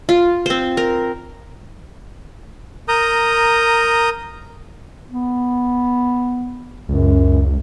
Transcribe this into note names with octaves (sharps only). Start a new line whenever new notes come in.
F4
C4 C5
A#4
A#4 A#5 D#6 G6
B3
C#2 F#2